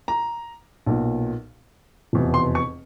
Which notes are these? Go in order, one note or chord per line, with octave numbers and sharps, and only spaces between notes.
A#5
B1 A#2
F1 E2 B2
C6
C#6